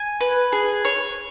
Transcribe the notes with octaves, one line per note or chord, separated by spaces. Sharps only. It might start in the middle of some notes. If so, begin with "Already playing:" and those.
Already playing: G#5
B4
G#4
C#5